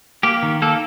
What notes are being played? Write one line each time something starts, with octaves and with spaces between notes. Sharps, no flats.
A#3 G4
D#3
A#3 A4